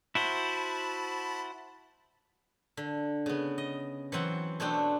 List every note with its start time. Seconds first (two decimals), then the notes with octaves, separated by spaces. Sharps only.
0.15 E4 F#4 C5 A5 B5
2.77 D3
3.26 C#3 B3
3.58 D#5
4.12 E3 F#3 C4 F#5
4.60 B2 A3 C4 D4 G5